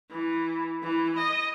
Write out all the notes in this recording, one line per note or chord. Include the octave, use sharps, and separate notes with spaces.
E3
E3
D#5